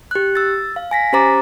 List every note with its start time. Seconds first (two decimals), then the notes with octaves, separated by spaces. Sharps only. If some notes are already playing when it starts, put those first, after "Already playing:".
0.11 G4 F#6
0.35 E6 A6
0.76 F5
0.91 G#5 A#6 B6
1.13 C#4 G4 C5 A#5 D6 A6